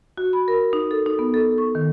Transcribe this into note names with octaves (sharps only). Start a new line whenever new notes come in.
F#4
B5
A#4
D#4
A4
D#4
B3
A4
C#6
D#3